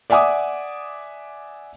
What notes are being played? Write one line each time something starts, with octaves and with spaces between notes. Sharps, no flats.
D5 E5 F#5 G#5 D6 D#6